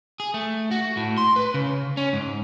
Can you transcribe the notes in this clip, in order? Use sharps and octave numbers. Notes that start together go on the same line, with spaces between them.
G#4
A3
F#4
A2
C6
B4
C#3
C#4
G#2